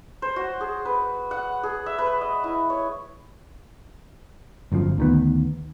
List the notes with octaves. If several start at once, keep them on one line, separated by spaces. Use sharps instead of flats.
C5
F#4
G#4
B4
F#5
G#4
E5
B4
D#5
E4
C#5
G1 F#2 C#3 F3
D2 D#3 B3